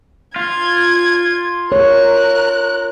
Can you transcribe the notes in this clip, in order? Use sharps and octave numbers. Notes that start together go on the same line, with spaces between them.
F4 G#6
A#4 C#5 F#6